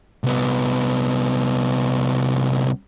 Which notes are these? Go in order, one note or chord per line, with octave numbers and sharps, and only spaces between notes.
C2 B3